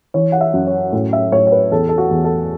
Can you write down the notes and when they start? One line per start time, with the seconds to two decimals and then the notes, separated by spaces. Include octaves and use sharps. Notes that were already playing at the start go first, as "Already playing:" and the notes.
0.14 E3 C#5
0.32 F#5
0.41 E5
0.54 F#2
0.67 C#5
0.93 A2
1.13 E5
1.32 A2 C#5
1.47 C#5
1.52 B4
1.72 E2 A4
1.89 A4
1.98 F#4
2.11 E2
2.24 A4